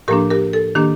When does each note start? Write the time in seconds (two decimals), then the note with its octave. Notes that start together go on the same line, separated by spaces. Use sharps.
0.08 A2 F3 A#3 D4 G4 A#4
0.31 G4 A#4
0.53 A4
0.75 D#3 A#3 D4 G4